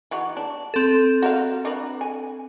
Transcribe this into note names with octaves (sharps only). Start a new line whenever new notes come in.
E3 D#4 F#4
D4
C4 A4
F#4 A#4 F5
D4 A#4 B4
G#5